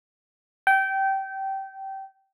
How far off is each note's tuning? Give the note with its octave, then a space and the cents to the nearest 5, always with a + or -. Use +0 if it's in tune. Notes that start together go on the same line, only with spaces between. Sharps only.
G5 -20